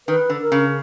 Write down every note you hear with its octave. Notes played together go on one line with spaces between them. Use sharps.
D#3 B4
D3
A#4
C#3